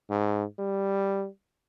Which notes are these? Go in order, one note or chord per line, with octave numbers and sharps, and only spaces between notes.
G#2
G3